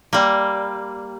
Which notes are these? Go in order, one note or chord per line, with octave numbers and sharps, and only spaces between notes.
G3 A#3